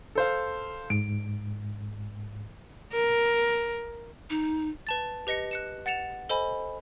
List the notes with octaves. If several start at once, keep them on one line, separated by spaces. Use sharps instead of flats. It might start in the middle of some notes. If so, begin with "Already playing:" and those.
A4 C5 F5
G#2 D7
A#4
D#4
B4 A5 A6
G4 B4 D#5 A#6 C#7
F#6 C#7 E7
F#5 A6 C#7 E7 F7
A4 C5 D#5 G#5 B5